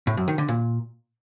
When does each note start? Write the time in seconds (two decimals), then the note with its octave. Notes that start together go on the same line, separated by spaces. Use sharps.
0.07 A2
0.17 F#2
0.28 D#3
0.38 D3
0.48 A#2